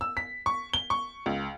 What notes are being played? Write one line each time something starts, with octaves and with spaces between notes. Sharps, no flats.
E6
B6
C#6
G7
C#6
C#2